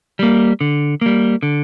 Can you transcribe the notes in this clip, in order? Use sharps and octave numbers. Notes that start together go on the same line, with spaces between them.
G3 A#3
D3
G3 A#3
D3